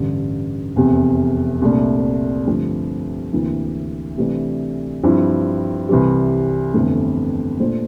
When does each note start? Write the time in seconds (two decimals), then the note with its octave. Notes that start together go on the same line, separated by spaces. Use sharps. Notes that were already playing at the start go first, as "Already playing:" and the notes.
Already playing: A1 G2 D3
0.76 F1 E2 C3
1.62 C2 A#2 A3 D4
2.47 G2 D3 F3 A3 C4
3.33 D2 C3 E3 A#3 E4
4.17 C3 E3 A3 D4
5.03 G2 F3 C4 E4
5.89 C2 C3 E3 G3
6.74 G1 F2 E3 A3
7.60 A#2 A3 D4 F4 C5